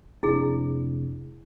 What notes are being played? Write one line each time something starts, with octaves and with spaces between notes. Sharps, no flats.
F1 C3 D4 E4 G#4